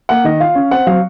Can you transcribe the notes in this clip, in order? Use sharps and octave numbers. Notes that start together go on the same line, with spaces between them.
A#3 F#5
D#3 D#5
F4 F5
C#4
C4 F#5
F#3 F5